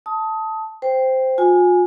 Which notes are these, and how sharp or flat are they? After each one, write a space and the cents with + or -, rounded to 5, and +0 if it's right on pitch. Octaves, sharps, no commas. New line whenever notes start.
A5 +0 D#6 +20
C5 -5 G5 +5
F4 +45 G#5 +0